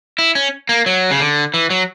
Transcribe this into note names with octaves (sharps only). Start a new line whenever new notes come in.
E4
C#4
A#3
F#3
C#3
D3
E3
F#3